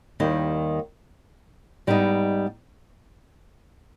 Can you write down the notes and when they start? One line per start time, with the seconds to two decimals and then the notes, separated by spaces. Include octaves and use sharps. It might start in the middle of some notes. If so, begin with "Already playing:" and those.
0.20 D#2 D#3 G3
1.87 G#2 G3 B3 D#4